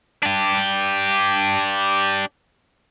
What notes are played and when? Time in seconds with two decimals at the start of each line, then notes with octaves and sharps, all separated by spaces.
0.23 D4 G4